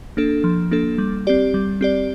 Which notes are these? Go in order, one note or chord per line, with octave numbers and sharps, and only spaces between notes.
A#3 D4 A4
F3
A#3 D4 A4
G3
C4 G4 D5
G3
C4 G4 D5